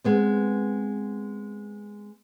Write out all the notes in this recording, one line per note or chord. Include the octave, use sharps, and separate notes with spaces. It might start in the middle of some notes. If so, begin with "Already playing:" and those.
G#3 B3 C4